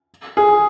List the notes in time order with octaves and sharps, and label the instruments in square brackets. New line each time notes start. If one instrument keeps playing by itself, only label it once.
[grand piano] G#4